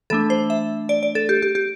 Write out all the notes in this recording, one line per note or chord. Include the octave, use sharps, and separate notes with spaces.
E3 A3 D4 A4
C5
E5
D5
D5
A4
G4
G4
G4